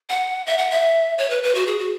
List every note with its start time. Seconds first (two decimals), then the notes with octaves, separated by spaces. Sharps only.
0.09 F#5
0.47 E5
0.58 F#5
0.71 E5
1.18 C#5
1.30 B4
1.43 B4
1.55 F#4
1.67 G#4
1.79 F#4